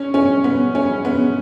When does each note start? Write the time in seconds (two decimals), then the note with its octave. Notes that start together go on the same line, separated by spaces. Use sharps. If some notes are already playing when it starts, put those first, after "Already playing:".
Already playing: C#4
0.14 C#4
0.44 B3
0.75 C#4
1.05 B3